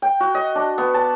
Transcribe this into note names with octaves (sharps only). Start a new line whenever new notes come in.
G5
F#4
D#5
D4
B3
A5